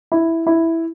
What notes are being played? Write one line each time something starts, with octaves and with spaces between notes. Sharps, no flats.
E4
E4